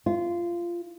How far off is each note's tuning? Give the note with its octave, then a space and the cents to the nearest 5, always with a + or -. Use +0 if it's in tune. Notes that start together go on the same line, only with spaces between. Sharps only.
F4 -15